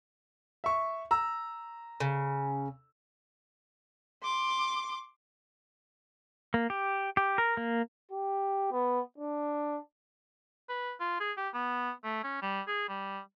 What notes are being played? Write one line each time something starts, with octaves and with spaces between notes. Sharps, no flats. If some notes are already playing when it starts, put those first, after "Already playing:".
E5 C#6
A#5 E6
C#3
C6 D6
A#3
G4
G4
A#4
A#3
G4
B3
D4
B4
F4
G#4
G4
B3
A3
C#4
G3
G#4
G3